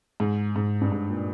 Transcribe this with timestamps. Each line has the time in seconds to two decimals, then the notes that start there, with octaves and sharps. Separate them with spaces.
0.20 G#2
0.56 G#2
0.81 G2
0.92 G#2
1.10 A#2